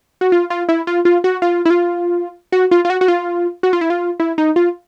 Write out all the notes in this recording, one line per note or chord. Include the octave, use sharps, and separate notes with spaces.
F#4
F4
F4
E4
F4
F4
F#4
F4
E4
F4
F#4
F4
F4
F#4
F#4
F4
F#4
F4
E4
F4
E4
D#4
F4